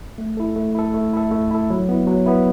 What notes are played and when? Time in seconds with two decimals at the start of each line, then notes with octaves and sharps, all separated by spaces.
0.18 A3
0.37 E4 A4
0.56 A3
0.75 E4 A4
0.94 A3
1.13 E4 A4
1.31 A3
1.51 E4 A4
1.70 F#3
1.89 B3 E4
2.07 F#3
2.26 B3 E4